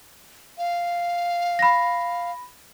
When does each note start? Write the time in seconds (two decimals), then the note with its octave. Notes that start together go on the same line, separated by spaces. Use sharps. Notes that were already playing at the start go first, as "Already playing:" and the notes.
0.58 F5
1.59 B5 A#6